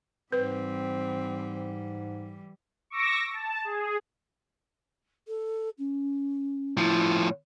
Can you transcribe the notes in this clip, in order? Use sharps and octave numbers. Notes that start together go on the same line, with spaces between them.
G#2 E3 G3 C4 B4
C#6 D6 E6 A#6
A5
G#4
A4
C#4
A2 F3 E4